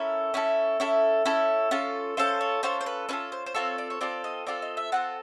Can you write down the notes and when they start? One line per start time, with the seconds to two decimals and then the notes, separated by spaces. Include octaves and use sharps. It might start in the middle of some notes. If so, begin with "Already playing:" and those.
Already playing: C#4 E4 A4 A#4
0.34 C#4 E4 A4
0.80 C#4 E4 A4
1.25 C#4 E4 A4
1.71 C#4 F4 A4
2.17 C#4 F4 A4 C5
2.41 C#5
2.63 C#4 F4 A4 C5
2.81 C5
2.86 B4
3.09 C#4 F4 A4 B4
3.32 C5
3.46 C5
3.54 C4 F4 A4 C#5
3.78 D5
3.90 C#5
4.01 C4 F4 A4 D5
4.24 D#5
4.47 C4 F4 A4 D5
4.62 D#5
4.77 E5
4.92 C4 F4 A4 F#5